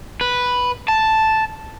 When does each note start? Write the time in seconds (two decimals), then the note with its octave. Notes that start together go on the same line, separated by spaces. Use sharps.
0.21 B4
0.88 A5